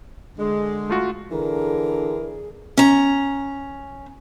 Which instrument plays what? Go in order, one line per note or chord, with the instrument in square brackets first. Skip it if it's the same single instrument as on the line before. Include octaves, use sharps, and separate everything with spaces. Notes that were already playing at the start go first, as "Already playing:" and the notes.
[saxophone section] D3 G#3
[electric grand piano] A3 F4 F#4
[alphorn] D3 [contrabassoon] E3 [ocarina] G#4 [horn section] A#4
[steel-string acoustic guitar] C#4 A#5